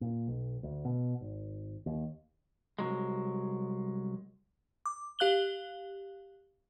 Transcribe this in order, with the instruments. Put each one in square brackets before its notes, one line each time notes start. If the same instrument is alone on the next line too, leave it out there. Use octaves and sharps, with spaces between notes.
[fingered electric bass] A#2
B1
D2
B2
G#1
D#2
[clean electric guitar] C2 F2 F#3 G#3
[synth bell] D6
G4 F5 F#6 F#7 G7